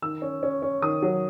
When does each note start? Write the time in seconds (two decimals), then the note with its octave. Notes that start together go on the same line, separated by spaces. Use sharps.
0.02 D#3 E6
0.22 C#4
0.43 C#4
0.62 C#4
0.82 D#3 D#6
1.03 F#3